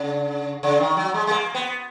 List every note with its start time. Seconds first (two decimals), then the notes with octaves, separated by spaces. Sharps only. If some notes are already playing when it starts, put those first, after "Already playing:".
Already playing: C#3
0.63 C#3
0.80 D#3
0.97 F#3
1.14 G#3
1.27 G#3
1.31 A#3
1.55 B3